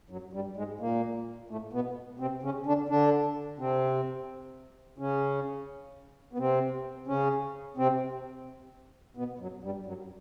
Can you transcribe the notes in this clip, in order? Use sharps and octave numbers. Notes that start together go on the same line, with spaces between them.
F#2 F#3
G2 G3
G#2 G#3
A#2 A#3
A2 A3
B2 B3
C3 C4
C#3 C#4
D3 D4
D3 D4
C3 C4
C#3 C#4
B3
C3 C4
C#3 C#4
C3 C4
B2 B3
F#2 F#3
G2 G3
F#2 F#3